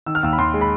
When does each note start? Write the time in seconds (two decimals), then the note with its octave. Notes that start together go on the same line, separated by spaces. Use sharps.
0.06 D#3 E6
0.15 F6
0.23 D#2 E6
0.33 B5
0.38 D#2 C6
0.54 G#3
0.61 B5